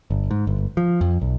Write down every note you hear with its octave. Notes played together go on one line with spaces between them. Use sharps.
G1
G#2
G1
F3
F2
B1